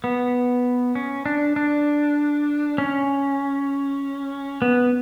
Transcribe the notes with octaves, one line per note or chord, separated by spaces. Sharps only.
B3
C#4
D4
D4
C#4
B3